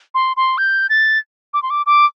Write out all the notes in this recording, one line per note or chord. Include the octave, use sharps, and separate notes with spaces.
C6
C6
G6
A6
D6
C6
D6
D6